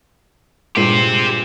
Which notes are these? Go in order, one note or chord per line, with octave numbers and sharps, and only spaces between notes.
G2 A#2 G#3 G4 C5